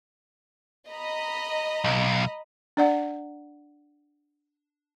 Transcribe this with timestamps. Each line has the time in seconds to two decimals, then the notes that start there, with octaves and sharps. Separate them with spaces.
0.89 D#5 A#5 B5
1.84 B1
2.77 D4 D5 F#5